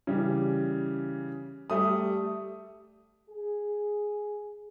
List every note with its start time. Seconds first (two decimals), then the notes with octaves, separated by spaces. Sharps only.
0.07 C#3 E3 G3
1.70 G3 A3 D#6
3.30 G#4